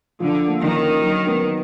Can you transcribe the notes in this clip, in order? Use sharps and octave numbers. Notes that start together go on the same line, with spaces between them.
D3 F3
A#3
D#3
C#4
F#3
B3